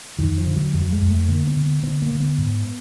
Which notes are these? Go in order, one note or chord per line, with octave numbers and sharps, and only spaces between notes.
F2 D#3
F3
D3
F#3
F2 F#3
G#3
F2
A3
D3 A#3
B3
D3
B3
D3 B3
A#3
D3
B3
G#2